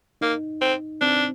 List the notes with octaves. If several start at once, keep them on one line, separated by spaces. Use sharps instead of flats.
A#3 D#4
C4
C4 D4